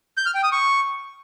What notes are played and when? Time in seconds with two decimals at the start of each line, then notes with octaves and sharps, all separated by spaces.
0.17 G6
0.26 F6
0.35 G5
0.43 D#6
0.52 C#6